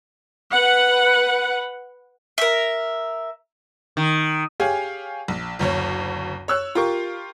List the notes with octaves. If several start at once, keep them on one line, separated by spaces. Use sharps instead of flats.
B4 F#5
A#4 E5
D#3
G4 G#4 C#5 F5 G#5
A#1
F#1 D2 C#5
C#5 E6 F#6
F4 G4 A#4 C#6